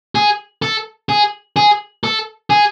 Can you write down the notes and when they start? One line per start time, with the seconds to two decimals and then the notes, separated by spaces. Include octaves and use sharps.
0.15 G#4
0.62 A4
1.09 G#4
1.56 G#4
2.04 A4
2.50 G#4